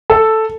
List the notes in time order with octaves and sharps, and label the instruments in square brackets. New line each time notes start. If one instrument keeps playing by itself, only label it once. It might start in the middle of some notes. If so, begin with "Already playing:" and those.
[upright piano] A4